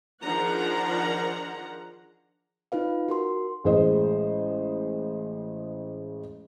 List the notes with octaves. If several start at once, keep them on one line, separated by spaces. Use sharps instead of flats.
D#3 F3 D4 G#4 F#5 A#5
D#4 F4 B4 F5
F#4 A#4 C6
A1 G#3 C5 D#5